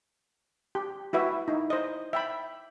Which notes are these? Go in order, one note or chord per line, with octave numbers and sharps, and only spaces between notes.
G4
E4 F#4 B4 E5
D#4 E4
C5 D#5
E5 G5 B5